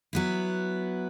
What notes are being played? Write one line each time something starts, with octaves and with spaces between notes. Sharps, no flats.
F#3 B3 E4